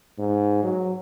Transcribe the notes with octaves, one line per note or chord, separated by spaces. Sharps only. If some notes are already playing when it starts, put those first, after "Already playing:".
G#2
F#3